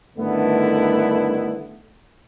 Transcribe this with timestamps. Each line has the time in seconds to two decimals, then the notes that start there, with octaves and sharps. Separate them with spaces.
0.17 G2 D3 D#3 A3 B3 E4